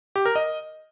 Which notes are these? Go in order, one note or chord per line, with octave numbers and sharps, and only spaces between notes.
G4
A#4
D#5